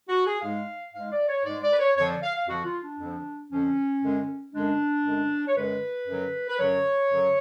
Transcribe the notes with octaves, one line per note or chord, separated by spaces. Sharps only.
F#4
G#4
G#2 G#3 F5
G#2 G#3 F5
D5
C#5
G#2 G#3 D5
D5
B4
C#5
F2 D3 F3 C#5
D5
F5
F5
F2 D3 F3 F#4
F4
D4
F2 D3 F3
F2 D3 F3 C#4
F#2 D3 G#3
F#2 D3 G#3 D4
F#2 D3 G#3
C#5
F#2 D3 G#3 B4
F#2 D3 F#3
B4
F#2 D3 F#3 C#5
F#2 D3 F#3